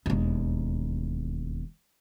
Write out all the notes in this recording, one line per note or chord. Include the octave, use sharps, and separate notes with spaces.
E1 D#2